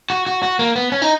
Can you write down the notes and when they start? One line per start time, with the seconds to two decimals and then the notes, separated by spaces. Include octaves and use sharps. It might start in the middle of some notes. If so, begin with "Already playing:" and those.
0.10 F#4
0.26 F#4
0.43 F#4
0.59 A#3
0.76 B3
0.92 C#4
1.02 D#4